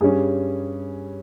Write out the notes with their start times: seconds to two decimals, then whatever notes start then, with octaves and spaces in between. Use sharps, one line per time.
0.01 G2 G3 C#4 G#4